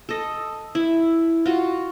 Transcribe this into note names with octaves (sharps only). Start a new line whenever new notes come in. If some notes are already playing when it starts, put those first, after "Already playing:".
A4 D#5
E4
F4 F#4